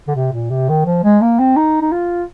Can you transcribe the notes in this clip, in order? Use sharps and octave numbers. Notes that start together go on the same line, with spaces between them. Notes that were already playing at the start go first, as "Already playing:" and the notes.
D3
C3
A#2
C3
D#3
F3
G#3
A#3
C4
D#4
D#4
F4